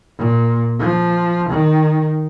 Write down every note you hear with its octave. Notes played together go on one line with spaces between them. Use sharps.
A#2
F3
D#3